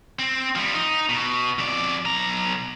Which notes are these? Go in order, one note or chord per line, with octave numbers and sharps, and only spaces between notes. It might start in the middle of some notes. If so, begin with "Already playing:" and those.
C4
F3 G3
D#4
B2
F2 D5
B1 A#5